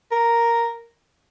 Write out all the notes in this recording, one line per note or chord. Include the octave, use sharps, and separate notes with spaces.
A#4